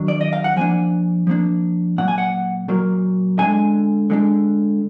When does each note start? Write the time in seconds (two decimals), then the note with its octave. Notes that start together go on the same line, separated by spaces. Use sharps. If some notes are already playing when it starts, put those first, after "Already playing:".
Already playing: D#3 F#3 D4
0.08 D5
0.21 D#5
0.33 F5
0.44 F#5
0.56 F3 A#3 D4 G#5
1.27 F3 A#3 D4
1.98 A#2 F#3 A#3 F#5
2.08 G#5
2.18 F#5
2.68 A#2 F#3 A#3
3.39 D3 G#3 D4 G#5
4.10 D3 G#3 D4